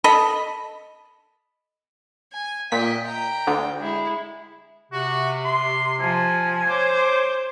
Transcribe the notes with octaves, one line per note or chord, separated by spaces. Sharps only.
A4 D#5 A5 B5
G#5
A#2 D#5 G5 B6
G5 A#5
D2 D3
G#3 E4
C3 F#4
C6
F3 G#5
C5 C#5 D6